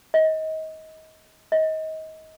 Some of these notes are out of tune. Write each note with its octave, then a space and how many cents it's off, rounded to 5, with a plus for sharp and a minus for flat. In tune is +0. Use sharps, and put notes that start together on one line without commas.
D#5 +25
D#5 +25